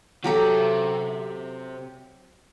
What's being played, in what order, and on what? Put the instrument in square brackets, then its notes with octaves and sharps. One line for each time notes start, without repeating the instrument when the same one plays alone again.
[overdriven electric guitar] C3 A#5 [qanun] F#3 G4 A4